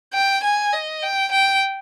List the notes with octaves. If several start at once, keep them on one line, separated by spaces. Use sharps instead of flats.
G5
G#5
D#5
G5
G5